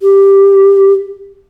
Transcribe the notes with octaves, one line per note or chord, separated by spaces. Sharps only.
G4